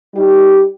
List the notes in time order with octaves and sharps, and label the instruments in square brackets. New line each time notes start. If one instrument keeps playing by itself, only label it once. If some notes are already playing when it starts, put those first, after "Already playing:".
[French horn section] G3 D#4 G4